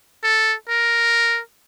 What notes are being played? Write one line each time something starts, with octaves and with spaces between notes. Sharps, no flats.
A4
A#4